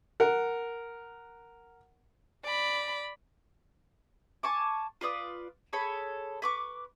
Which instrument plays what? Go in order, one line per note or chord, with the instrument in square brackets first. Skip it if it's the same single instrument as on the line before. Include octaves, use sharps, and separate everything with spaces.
[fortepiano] A#4 F#5
[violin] D5 B5
[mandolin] G#5 A5 C#6 D6
F4 B4 D5 D#6
G#4 A4 C#5 B5
B4 C#6 D6